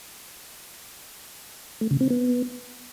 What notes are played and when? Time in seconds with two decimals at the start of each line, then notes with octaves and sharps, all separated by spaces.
1.81 A3
1.91 C#3
2.01 C4
2.10 B3